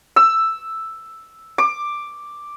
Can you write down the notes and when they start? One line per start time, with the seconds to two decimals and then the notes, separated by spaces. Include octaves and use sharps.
0.16 E6
1.58 D6